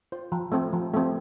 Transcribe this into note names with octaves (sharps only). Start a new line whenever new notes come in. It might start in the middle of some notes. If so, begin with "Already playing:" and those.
F4 C5
F3
A3 C4
F3
A3 C4